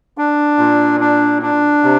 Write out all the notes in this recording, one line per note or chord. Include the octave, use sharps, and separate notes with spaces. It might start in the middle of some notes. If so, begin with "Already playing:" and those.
D4
A#2
D4
D4
C3